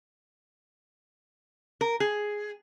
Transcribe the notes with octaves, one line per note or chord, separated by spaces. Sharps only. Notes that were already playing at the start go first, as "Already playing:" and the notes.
A#4
G#4